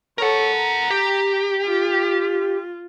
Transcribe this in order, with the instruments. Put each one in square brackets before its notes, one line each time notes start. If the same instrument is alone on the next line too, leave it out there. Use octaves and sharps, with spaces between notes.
[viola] A4 C#5 [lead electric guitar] A#4 F#5
[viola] A#5
[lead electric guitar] G4
[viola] F4